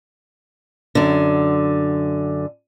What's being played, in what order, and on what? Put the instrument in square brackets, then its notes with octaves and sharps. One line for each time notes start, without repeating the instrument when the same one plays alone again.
[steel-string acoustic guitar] F#2 D3